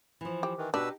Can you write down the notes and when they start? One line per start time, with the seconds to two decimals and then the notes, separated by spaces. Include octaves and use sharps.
0.21 E3 F3
0.43 G4
0.58 D#3 E3
0.74 B2 D4 D#4 G4 B4 E6